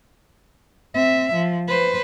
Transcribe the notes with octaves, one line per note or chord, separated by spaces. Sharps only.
C4 E5
F3
B4 C5